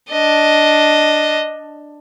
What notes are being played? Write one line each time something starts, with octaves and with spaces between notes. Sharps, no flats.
D4 D#5